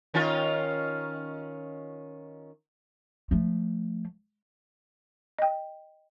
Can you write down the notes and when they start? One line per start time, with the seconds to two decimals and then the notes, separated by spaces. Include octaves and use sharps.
0.14 D#3 C#4 F4
3.31 F3 A3
5.39 D#5 G5